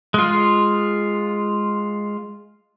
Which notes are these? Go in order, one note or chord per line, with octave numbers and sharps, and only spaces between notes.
G#3 F4